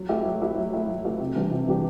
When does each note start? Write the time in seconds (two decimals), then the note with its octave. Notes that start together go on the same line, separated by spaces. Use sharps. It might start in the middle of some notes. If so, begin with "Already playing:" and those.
Already playing: F#3
0.09 A3 E4 G4
0.25 F#3
0.42 A3 E4 G4
0.57 F#3
0.73 A3 E4 G4
0.88 F#3
1.05 A3 E4 G4
1.20 C3
1.36 E3 G3 D4 G4
1.51 C3
1.67 E3 G3 D4 G4